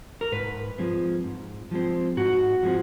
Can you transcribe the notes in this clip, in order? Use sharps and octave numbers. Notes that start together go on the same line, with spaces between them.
A#4
G#2 B4
F3 G#3 C4
G#2
F3 G#3 C4
G#2 F#4
F3 G#3 C4